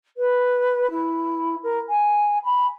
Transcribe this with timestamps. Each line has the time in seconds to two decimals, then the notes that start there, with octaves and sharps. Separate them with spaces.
0.17 B4
0.90 E4
1.63 A#4
1.89 G#5
2.43 B5